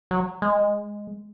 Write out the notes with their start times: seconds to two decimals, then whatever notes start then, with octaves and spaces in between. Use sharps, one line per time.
0.11 F#3
0.42 G#3